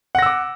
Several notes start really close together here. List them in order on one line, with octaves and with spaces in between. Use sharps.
F#5 A#6 E6 D6